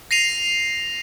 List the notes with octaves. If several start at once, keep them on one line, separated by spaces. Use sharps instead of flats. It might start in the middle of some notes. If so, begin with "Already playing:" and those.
A#6 C7 D#7 F7